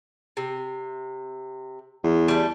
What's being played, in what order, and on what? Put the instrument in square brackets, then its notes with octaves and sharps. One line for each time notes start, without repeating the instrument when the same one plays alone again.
[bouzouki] C3
[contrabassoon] E2
[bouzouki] G3 A3